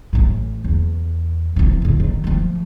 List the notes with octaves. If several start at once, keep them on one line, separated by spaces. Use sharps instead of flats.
A1 A2
E2
C3 E3
D2 A2
D#3
F3 A3